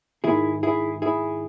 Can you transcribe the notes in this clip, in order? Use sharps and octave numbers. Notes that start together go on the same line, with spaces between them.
G#2 D#3 E4 G#4
E4 G#4
E4 G#4